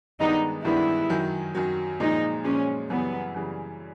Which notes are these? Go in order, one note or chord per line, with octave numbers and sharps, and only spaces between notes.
G2 D#3 G#3 B3 D4 D#4
G2 D#3 G#3 B3 D4 E4
F#2 D#3 F#3
F#2 D#3 F#3
A#2 F3 G#3 D#4
A#2 F3 G#3 C#4
F#2 C#3 E3 G3 B3
F#2 C#3 E3 G3